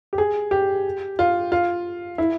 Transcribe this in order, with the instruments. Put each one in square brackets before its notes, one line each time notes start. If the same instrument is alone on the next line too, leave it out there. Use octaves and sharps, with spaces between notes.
[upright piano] G4
G#4
G4
F4
F4
E4